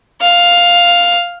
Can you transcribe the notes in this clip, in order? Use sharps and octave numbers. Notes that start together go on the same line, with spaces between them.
F5